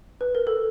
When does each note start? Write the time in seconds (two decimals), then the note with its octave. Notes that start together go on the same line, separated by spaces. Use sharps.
0.21 B4
0.35 A#4
0.47 A4